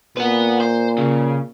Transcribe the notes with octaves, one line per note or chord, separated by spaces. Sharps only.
A#2 B4 F#5
C5
C#3